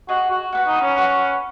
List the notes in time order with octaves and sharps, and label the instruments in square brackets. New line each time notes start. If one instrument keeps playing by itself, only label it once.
[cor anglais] F#4 [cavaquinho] G#4 D#5 F#5
[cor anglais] F#4
[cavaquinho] F#4 B4 F#5
[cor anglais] D#4
C#4
[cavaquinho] F#4 B4 F#5